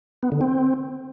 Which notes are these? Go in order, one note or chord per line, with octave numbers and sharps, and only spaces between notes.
B3
D3
C4